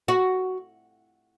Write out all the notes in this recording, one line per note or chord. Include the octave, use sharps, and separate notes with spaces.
F#4